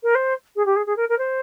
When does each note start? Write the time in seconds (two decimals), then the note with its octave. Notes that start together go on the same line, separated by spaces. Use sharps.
0.03 A#4
0.15 C5
0.56 G#4
0.66 G4
0.76 G#4
0.86 G#4
0.97 A#4
1.09 A#4
1.18 C5